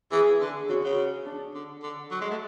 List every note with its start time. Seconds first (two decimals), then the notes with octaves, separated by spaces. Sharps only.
0.11 E3 G#4
0.41 D3
0.69 C#3 F#4
0.84 C#3
1.26 D4
1.54 D3
1.83 D3
2.11 F#3
2.21 G#3
2.30 A3